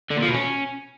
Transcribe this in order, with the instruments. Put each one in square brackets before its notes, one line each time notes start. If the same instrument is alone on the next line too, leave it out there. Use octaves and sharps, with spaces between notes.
[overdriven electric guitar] D3
A#2
F3
B2
C#4